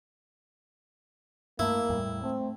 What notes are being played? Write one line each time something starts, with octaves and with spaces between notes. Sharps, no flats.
G2 A3 A#3 E4
E2 A2 G3
A3 C4